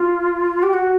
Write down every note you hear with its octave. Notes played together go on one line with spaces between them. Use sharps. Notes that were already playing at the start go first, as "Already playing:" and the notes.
Already playing: F4
G4
F#4